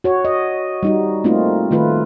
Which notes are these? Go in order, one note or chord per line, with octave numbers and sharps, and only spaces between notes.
F#4 C#5
D#5
G3 D#4 F#4
A3 A#3 C4 D#4 F4
D#3 A3 F4 B4